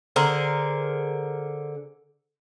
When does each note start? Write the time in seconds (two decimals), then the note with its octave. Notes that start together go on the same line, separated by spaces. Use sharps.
0.16 D3 G#4 A#4 C5